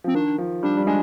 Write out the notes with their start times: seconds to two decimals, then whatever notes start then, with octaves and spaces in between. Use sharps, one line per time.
0.04 F3 C4
0.15 D#3 D4
0.38 F3
0.63 G3 D4
0.77 G3
0.87 G#3 D4